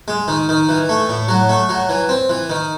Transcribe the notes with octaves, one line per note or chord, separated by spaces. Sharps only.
G#3
D#3
D#3
E3
A3
A2
F#3
A3
F#3
E3
C4
E3
D#3